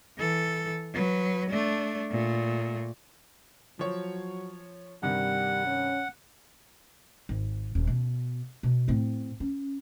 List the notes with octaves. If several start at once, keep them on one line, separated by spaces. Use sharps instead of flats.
E3 A4
F#3 B4
A3 D4
A#2 A3
F3 F#3 C#5
G2 C3 D#3 G3 F#5
C#4
G#1
D#1
B2
B2
A2 C4
C#4